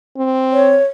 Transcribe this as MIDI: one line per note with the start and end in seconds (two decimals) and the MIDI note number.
0.18 0.79 60
0.52 0.84 73